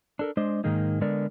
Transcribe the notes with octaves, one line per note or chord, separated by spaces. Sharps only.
D4 A4 A#4
G#3 D4 C5 D#5
G#2 D#3 G#3 A#3 D#4
D3 G#3 B3 A#4 D5